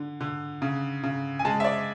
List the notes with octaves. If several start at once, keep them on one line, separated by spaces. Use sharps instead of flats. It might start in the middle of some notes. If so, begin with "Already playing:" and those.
Already playing: D3
D3
C#3
C#3
G#5
G#3 A5
E5
D5